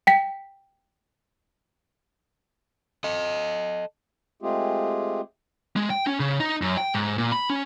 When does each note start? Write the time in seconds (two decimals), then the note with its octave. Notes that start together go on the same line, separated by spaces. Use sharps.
0.07 G5 B6
3.04 A4 D#5
4.42 G#3 A3 C4 F4 G4 G#4
5.76 G#3
5.90 G5
6.07 C#4
6.20 C#3
6.40 D#4
6.62 F#2
6.77 G5
6.94 G#2
7.18 A#2
7.32 B5
7.50 C#4